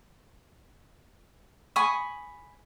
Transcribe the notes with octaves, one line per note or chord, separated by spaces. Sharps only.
G#5 B5 C#6 D#6